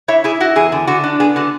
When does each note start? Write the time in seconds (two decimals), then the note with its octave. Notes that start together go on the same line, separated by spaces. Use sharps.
0.08 E4 C#5 E5
0.24 E4 G#4
0.40 E4 F#4
0.56 E2 G#4
0.72 D3
0.87 D3 F#4
1.04 D4
1.20 B3 G#4
1.36 D3 F#4